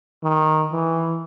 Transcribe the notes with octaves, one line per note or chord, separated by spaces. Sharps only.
D#3
E3